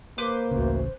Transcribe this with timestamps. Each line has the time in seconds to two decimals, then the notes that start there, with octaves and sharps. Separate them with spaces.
0.18 A#3 B4 C5 D6
0.51 A1 D2 C#3